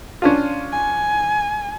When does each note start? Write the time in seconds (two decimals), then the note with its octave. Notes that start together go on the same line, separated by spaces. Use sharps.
0.22 C#4 D4 F4
0.72 G#5